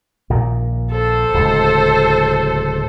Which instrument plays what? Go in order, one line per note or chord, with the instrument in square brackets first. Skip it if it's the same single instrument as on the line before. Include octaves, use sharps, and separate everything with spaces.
[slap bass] A#1 A#2 D#3
[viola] A4 C5
[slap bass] D1 C#2